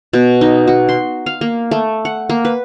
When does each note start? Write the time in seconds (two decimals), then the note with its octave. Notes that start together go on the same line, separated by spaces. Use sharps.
0.13 B2
0.41 D#4
0.67 F#4
0.89 C6
1.26 F5
1.41 A#3
1.71 A3
2.05 F#5
2.30 A#3
2.45 B4